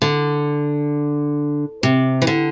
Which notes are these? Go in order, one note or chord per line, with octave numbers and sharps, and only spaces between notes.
D3
C3
E3
D3